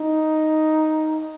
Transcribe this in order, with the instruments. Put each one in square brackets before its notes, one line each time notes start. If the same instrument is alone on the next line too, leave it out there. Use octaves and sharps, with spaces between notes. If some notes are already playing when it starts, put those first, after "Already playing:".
Already playing: [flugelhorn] D#4